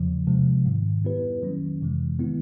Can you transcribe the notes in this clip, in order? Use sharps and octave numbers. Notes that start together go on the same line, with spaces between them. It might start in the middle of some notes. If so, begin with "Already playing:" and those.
Already playing: E2 C#3 F3
C3 F3 G#3
G#2 D#3 G3
G3 B3 E4 G4 B4
D#3 F#3 A#3 C#4
F2 C3 E3 G#3
D#3 G#3 B3 E4